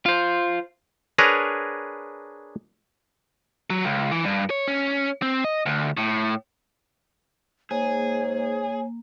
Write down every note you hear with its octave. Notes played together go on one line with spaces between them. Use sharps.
F4 C5
D4 G#4 A#4 B4 C#5 A#5
F#3
C#2
E3
G2
C#5
C#4
C4
D#5
D2
A2
G#2 A#3 G#4 C#5